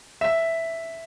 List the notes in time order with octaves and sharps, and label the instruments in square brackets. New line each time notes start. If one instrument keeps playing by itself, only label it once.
[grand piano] E5